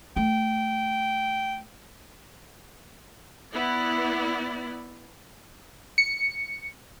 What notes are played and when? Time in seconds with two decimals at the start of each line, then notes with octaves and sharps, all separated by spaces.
0.16 A3 G5
3.53 B3 E4 D5
5.98 C#7